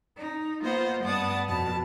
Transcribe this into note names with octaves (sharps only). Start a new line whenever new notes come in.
D#4
A#3 B3 F4 C5 D#5 F#5
G2 B3 D5 F#5 A5 D#6
F2 B2 A5